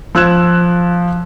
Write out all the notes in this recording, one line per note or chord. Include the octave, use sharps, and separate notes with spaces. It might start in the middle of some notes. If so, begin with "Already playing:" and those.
F3 E6 F#6 G#6 E7